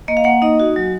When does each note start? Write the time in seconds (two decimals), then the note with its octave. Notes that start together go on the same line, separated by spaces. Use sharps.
0.08 A#3 D#5
0.17 F5
0.24 A#3 F#5
0.42 D#4 D#5
0.60 F#4
0.76 F#3